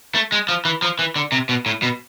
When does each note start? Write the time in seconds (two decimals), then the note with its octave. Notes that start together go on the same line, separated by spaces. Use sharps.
0.15 A3
0.32 G#3
0.49 F3
0.65 E3
0.82 F3
0.99 E3
1.16 D3
1.32 C3
1.49 B2
1.66 A2
1.83 B2